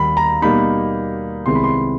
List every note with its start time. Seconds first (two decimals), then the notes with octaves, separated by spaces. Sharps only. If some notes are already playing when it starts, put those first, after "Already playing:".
Already playing: D#2 D#3 G3 B5
0.17 A#5
0.42 B2 G3 A#3 D#4 B5
1.46 C2 C3 D#3 G#3 B3 C6
1.55 B5
1.64 C6